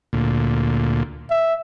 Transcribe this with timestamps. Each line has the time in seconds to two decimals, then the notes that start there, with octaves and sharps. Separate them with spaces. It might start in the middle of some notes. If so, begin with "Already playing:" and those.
0.13 D2 A#2
1.30 E5